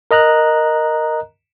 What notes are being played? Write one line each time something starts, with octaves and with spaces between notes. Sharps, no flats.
A#4 D#5 A#5 F#6